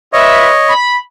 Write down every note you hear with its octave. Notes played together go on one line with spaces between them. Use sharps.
F4 B4 C#5 D#5 E5
B5